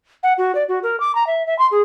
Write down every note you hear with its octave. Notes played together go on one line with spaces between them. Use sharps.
F#5
F#4
D5
F#4
A#4
D6
A#5
E5
E5
C6
G#4